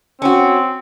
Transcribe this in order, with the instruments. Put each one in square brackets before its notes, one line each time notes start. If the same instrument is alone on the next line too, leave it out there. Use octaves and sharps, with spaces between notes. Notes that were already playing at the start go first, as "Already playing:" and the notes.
[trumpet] C4 [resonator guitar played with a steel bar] C#4 F#4